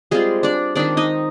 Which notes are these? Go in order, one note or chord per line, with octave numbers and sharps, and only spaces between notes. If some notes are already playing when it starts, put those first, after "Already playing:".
G3 G#3 C4 F4 G#4
D4 D5
D#3 G#3 C4 D4 D#4 D5
D#4 D#5